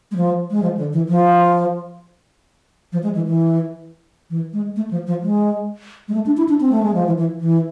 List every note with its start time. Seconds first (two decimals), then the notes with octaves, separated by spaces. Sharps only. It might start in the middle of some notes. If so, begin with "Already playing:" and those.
0.11 G#3
0.16 F3
0.51 G#3
0.63 F3
0.77 D3
0.93 E3
1.09 F3
2.92 F3
3.03 G#3
3.15 E3
3.27 E3
4.30 E3
4.53 G#3
4.76 A3
4.91 F3
5.07 F3
5.22 G#3
6.08 G#3
6.14 A3
6.26 D4
6.37 E4
6.49 D4
6.61 C4
6.72 A3
6.83 G#3
6.94 F3
7.06 E3
7.18 E3
7.40 E3